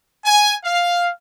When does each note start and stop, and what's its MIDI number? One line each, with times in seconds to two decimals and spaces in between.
0.25 0.53 80
0.64 1.10 77